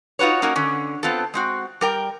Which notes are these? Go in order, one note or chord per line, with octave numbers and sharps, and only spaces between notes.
D#4 F4 F#4 B4 C#5
A#3 C#4 D#4 F#4 A#4
D3 C#4
B3 C4 F4 A4
G#3 C4 F#4
G3 A#4 G5